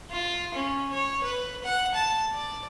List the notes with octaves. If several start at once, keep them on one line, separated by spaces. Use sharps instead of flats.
F4
C#4
C#5
B4
F#5
A5
D5